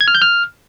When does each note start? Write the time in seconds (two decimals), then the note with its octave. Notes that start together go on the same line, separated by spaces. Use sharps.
0.01 G#6
0.08 F6
0.15 G6
0.22 F6